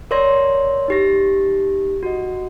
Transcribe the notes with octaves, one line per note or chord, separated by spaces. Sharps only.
A#4 C#5 D5 C6 A#6
D#4 G4 A#6
F#4 D#5